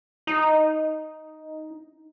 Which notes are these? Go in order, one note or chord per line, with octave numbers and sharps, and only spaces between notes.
D#4